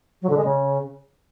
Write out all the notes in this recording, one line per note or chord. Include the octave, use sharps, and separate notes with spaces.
F#3
D3
G#3
C#3